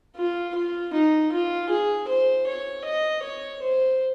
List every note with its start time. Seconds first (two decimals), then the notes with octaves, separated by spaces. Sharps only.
0.16 F4
0.55 F4
0.93 D#4
1.32 F4
1.69 G#4
2.08 C5
2.47 C#5
2.84 D#5
3.23 C#5
3.62 C5